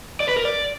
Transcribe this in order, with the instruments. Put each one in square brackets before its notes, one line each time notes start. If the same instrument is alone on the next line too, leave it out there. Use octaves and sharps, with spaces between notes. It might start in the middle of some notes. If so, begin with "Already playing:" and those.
[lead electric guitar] D5
B4
A#4
D5